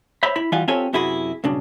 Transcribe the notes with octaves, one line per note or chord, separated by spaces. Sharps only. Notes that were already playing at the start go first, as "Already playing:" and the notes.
C5 C#5 E5 B5
E4 B5
E3 G3 F4 F#4 F5 G#5
C4 F4 G4 A4 C#5 G#5
F#2 C3 E4 F#4 G#4 B5
B1 G2 C#3 D4